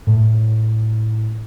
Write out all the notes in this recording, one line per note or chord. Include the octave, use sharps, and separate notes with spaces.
A2